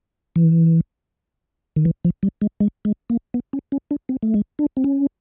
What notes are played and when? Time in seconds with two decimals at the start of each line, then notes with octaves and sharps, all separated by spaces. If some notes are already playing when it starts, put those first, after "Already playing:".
0.36 E3
1.76 D#3
1.85 E3
2.05 F3
2.23 G3
2.41 G#3
2.60 G#3
2.85 G#3
3.10 A#3
3.34 B3
3.53 C#4
3.72 C#4
3.91 D4
4.09 C4
4.23 A3
4.34 G#3
4.59 D4
4.77 C4
4.84 C#4